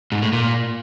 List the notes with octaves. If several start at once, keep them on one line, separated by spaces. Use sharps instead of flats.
G#2
A2
A#2